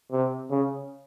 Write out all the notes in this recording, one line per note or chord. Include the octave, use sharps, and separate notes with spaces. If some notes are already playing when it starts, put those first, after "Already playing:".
C3
C#3